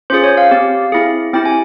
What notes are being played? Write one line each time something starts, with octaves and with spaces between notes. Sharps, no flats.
C#4 F4 G#4 C5
C#5
F5
C4 G4
C4 E4 G#4
C4 E4 G4 G5
G#5